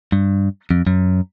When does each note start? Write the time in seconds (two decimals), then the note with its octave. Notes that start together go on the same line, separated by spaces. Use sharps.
0.12 G2
0.71 F2
0.87 F#2